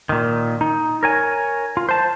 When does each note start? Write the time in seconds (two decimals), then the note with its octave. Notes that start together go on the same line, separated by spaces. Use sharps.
0.09 A#2 D#3
0.61 D#4
1.03 A#4 C#5 G#5
1.77 F4
1.89 C5 A5